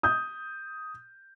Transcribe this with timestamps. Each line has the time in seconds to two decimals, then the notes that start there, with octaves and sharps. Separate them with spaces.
0.03 D#6 G6